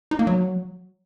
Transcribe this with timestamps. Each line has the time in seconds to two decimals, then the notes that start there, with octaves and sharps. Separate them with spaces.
0.11 D#4
0.19 A#3
0.27 F#3